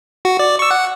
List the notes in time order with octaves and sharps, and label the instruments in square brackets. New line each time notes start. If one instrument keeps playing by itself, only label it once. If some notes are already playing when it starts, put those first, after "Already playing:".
[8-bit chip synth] F#4
D5
C#6 E6
F#5